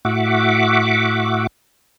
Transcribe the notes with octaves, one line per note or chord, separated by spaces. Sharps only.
A2 F#4 E5 F#5 D6